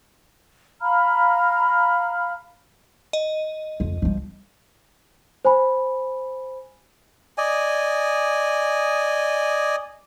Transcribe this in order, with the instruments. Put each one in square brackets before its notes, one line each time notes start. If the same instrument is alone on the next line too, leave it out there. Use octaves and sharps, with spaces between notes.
[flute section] F5 A#5 B5 F6
[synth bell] D#5
[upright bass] F2
F3 G3
[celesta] C5 G#5 B5
[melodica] D5 D#5 G#5